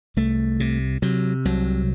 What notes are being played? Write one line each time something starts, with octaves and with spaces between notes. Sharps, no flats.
C2 A3
C3
C3 F#3
C2 F#3